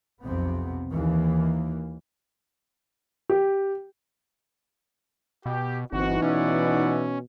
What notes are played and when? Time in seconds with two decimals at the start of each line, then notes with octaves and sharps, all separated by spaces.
0.24 B1 F2 C3 B3 C4
0.92 D#2 E3 A#3
3.29 G4
5.46 B2 G4
5.92 G1 E3 C4 D#4 F#4
6.22 B2 C#4 D5 E5 F#5